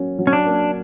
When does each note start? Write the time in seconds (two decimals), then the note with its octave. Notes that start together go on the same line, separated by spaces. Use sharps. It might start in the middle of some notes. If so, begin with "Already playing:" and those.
Already playing: F#3 A#3 C#4
0.19 F#3
0.27 C#4
0.33 D4
0.46 A#3